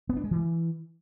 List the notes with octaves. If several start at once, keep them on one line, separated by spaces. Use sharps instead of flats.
B3
D4
G#3
E3